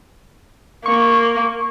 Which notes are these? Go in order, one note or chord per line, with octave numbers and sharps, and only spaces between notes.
A#3 C#6